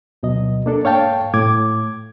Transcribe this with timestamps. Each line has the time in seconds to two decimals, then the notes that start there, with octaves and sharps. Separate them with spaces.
0.23 D2 B2 F#3 D#5
0.66 A#3 D4 A4
0.84 G#2 C#5 F5 G5 A5
1.34 A2 D6 G#6